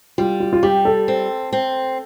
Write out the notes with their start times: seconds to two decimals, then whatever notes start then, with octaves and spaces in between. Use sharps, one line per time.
0.18 G3 F4
0.40 F4
0.53 F4
0.63 G3 G4
0.85 A4
1.08 C4
1.53 C4